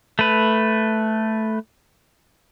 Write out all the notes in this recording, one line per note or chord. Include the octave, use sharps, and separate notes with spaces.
A3 B4